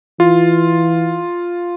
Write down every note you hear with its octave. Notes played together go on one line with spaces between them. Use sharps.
E3 F4